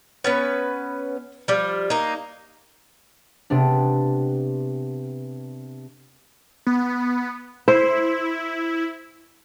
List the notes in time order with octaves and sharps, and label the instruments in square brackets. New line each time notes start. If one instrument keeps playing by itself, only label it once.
[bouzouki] B3 C#4 B4
F3 G3
A#3 D#4
[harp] C3 B3 D4
[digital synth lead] B3
[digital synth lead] E4 [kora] C5